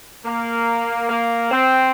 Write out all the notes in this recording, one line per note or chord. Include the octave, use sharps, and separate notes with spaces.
A#3
A#3
C4